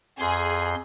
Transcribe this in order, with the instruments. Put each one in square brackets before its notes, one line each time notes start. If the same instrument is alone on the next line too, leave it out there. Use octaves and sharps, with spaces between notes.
[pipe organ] F2 C6 [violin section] G#4